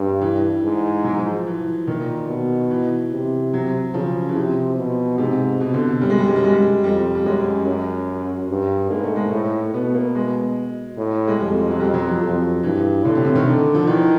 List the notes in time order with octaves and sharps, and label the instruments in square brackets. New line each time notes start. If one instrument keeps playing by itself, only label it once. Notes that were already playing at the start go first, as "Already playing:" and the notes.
Already playing: [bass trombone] G2
[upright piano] E3
[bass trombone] G#2
[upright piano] F#3
F3
E3
[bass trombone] A#2 [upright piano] D#3
[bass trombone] B2
[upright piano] E3
[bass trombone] C3
[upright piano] F#3
[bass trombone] C#3 [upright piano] F3
[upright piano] E3
[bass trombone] C3 [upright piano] F3
[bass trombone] B2
[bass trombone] G#2 [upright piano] C3
[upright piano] B2
D3
[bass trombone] F#2 [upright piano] G3
[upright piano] G#3
G3
G#3
G3
G#3
G3
[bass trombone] F2 [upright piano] G3
[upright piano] G3
[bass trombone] F#2 [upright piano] G#3
[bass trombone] F#2
G2
[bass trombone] G#2 [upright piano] A#3
[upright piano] A3
G#3
[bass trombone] A2 [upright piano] A3
[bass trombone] B2 [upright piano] B3
[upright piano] A#3
G#3
[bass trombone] A2
[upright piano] G#3
[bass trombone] F2 [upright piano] G3
[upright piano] F#3
[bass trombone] F2 [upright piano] G3
[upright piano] F#3
F3
[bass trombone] F2
[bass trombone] G2 [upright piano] E3
[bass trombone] A2 [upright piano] D3
[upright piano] C3
D3
D#3
[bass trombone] D3
[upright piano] F3
[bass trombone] D#3 [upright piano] E3